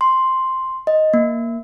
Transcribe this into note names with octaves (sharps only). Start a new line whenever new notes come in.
C6
D#5
A#3